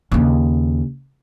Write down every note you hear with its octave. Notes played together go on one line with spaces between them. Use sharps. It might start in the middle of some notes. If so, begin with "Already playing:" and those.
D#2 C#3